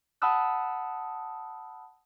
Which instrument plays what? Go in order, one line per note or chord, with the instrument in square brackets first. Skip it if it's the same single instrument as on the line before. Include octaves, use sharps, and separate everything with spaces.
[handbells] F#5 A5 B5 D#6 E6 F#6